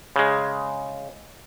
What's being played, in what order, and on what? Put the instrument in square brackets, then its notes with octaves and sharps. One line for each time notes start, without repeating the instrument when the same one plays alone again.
[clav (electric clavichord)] C#3 G#3